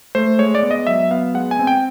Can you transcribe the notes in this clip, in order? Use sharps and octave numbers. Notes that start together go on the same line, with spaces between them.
A3 C5
G#3 C#5
D5
B3
D#5
F#3 E5
B3 F5
G#3 F#5
G#5
C4
G5